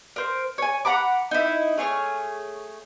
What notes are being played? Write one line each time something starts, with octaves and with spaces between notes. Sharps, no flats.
A#4 C5
C#5 G#5
F#5 A#5 B5 D6
D#4 E4
A3 G#4 C#5 F6